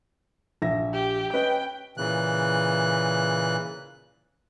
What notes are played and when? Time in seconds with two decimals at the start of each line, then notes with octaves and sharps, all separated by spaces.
0.62 A#1 E5 A#6
0.94 G4
1.33 C#4 B4 D#5 G5
1.97 A#2 C#3 E3 F#6